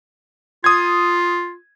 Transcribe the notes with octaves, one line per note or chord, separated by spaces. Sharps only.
F4 D#6 G#6